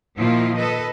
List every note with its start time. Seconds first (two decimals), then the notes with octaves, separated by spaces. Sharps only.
0.18 A#2 D#3 F3 A#3 E4 F4
0.56 A4 B4 D#5